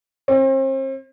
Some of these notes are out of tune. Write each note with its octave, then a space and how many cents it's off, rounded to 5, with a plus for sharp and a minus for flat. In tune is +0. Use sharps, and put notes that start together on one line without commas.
C4 +40